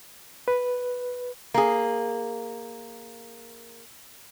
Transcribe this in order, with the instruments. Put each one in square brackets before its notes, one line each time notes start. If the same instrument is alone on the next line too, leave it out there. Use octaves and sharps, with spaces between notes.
[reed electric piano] B4
[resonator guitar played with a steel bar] A#3 G#4